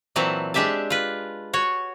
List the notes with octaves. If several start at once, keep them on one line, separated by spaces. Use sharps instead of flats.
A#2 E3 F#3 C4 A5
G#3 D4 G4 E5 A5
F4 B4
F#4 C#5